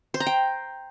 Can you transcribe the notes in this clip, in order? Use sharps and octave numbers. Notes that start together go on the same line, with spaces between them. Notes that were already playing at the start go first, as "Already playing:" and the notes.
C5
A#5
G5